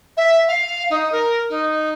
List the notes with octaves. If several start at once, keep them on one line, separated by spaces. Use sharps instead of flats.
E5
F5
D#4
A#4
D#4